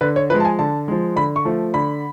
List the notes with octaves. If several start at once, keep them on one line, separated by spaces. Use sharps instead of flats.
D3 B4
C#5
F3 G#3 B4
A5
G#5
D3 A5
F3 G#3
D3 B5
C#6
F3 A3
D3 B5